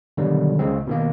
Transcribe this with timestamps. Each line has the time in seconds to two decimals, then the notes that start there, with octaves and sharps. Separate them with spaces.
0.17 B2 D3 D#3 F#3 G3
0.59 C#2 C#3 G#3 C4
0.87 B2 D#3 A#3